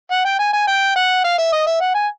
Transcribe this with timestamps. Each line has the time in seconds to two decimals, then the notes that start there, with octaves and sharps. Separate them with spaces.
0.11 F#5
0.25 G5
0.39 G#5
0.53 G#5
0.67 G5
0.96 F#5
1.24 F5
1.38 E5
1.52 D#5
1.66 E5
1.80 F#5
1.94 G#5